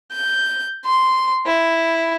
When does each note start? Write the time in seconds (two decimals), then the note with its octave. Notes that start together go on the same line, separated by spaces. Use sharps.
0.12 G6
0.86 C6
1.46 E4